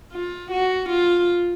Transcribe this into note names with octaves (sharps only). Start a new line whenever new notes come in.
F4
F#4
F4